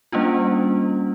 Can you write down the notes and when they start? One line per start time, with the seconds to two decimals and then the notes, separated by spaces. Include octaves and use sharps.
0.12 G3 A#3 C#4 D4 F4